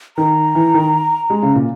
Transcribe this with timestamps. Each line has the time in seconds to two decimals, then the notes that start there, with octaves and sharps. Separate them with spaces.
0.17 D#3 A#5
0.55 E3
0.74 D#3
1.30 G#3
1.43 C#3
1.55 A#2